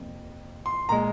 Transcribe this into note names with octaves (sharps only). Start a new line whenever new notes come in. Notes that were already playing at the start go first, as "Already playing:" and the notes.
Already playing: F2 C3 A#3
C6
A#2 G#3 A#5